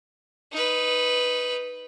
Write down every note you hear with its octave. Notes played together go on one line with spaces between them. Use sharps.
D#4 B4